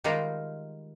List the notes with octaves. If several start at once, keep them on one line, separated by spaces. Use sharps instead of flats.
D#3 G3 G#3 D#4 F4 A#4